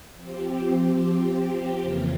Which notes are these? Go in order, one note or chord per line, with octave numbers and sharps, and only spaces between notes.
F3 C4 G4
F2 C#3 E3 A#3 F4